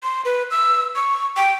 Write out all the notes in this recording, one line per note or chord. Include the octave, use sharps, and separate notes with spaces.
C6
B4
E6
C#6
G5